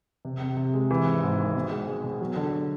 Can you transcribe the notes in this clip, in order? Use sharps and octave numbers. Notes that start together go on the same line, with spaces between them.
C3
C3
C3
G#3
E3
G#1
G#2
G#1
B2
G#3
G#3
B2
F#3
D3